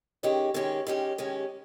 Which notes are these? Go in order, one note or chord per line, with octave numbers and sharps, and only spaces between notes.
D#3 G#3 C#4 G4
D#3 G#3 C#4 G4
D#3 G#3 C#4 G4
D#3 G#3 C#4 G4